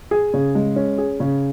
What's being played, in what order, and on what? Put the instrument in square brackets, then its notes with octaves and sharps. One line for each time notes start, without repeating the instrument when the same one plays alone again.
[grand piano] G#4
C#3
G#3
C#4
G#4
C#3